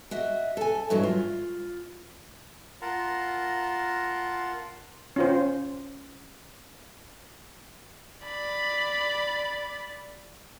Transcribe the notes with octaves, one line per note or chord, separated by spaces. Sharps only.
F#4 D#5 E5
A4 G#5
G2 E3 F#3 G#3
F4
F4 A#4 F#5 A5 A#5 C6
C#4 F4 C5
D5 B5